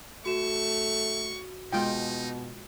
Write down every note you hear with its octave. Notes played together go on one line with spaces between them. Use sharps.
A3 F#4 C#6 E7
B2 G#3 D#4 F4 G5